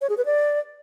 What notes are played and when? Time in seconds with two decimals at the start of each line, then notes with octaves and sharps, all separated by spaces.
0.01 C#5
0.09 G#4
0.17 B4
0.25 D5